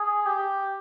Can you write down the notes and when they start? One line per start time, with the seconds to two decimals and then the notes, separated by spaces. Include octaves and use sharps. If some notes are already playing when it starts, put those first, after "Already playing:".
Already playing: G#4
0.26 G4